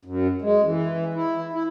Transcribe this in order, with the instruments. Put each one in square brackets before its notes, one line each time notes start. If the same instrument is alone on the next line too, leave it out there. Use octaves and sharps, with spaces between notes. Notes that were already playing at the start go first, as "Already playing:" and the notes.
[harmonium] F#2
G#3
E3
E4
E4